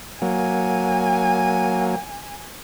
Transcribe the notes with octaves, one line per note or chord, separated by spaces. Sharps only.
F#3 A#3 G#5